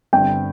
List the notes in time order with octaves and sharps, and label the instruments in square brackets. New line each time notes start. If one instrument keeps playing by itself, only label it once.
[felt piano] G1 G2 D3 C4 [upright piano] G5